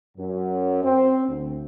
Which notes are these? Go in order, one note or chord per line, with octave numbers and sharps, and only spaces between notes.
F#2
C4
D2